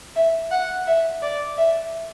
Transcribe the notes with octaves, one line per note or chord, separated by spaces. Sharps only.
E5
F#5
E5
D5
E5